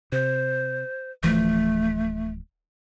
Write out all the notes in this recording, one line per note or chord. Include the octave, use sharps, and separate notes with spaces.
C3 C5
D1 E3 F3 A3